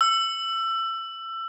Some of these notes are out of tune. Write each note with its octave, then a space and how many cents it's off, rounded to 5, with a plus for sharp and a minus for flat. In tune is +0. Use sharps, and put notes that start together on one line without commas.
E6 +25